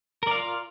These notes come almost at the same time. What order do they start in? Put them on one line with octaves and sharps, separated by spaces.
A#4 D5 F5 F4